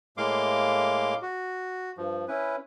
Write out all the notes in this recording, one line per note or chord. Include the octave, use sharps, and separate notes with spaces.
A2 G#3 A#3 F5 C6 D6
F#4
G2 F3
C#4 E4 B4